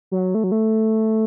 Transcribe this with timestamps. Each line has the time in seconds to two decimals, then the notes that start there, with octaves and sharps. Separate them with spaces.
0.11 F#3
0.35 A3
0.44 F#3
0.52 A3